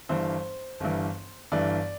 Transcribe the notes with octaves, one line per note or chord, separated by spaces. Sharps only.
G1 G2 E3 C5
G1 G2 E3
G1 G2 E3 D5